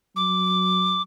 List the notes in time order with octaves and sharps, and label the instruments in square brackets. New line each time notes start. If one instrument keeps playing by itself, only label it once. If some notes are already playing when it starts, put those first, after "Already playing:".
[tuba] F#3 [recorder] D6